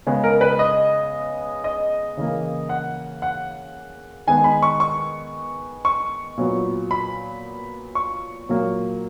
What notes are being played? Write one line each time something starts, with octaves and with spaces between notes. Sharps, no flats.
C#3 G#3 B3
A#4
B4
D#5
D#5
C#3 E3 A#3
F#5
F#5
D#3 G#3 B3 G#5
B5
C#6
C#6
C#6
A#2 F#3 B3
B5
C#6
A#2 F#3 A#3